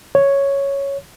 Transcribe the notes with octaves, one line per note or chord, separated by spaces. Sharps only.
C#5